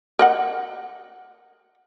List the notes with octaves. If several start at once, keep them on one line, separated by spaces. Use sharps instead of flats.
A#4 D#5 F#5